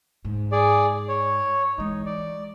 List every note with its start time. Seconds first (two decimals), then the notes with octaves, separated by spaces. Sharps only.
0.25 G#2
0.52 G#4 D5
1.09 C#5
1.78 E3 G#3 D#4
2.06 D5